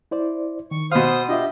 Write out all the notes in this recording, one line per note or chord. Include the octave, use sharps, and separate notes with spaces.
E4 C5 D5
D#3 C#6
B2 C5 F5 D#6
D4 F4 G4 D#5 E5